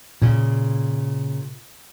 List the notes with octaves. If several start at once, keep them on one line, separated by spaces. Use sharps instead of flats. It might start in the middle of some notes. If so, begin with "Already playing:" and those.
A#2 C#3